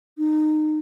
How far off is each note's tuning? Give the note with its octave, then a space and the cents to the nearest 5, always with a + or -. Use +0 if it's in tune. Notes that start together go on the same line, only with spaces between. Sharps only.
D#4 -20